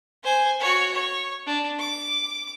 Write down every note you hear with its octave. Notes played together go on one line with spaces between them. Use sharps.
C5 G#5
F#4 C#5
C#5
D4
D6